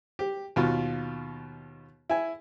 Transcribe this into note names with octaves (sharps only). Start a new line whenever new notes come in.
G4
D#2 B2 F4
E4 G#5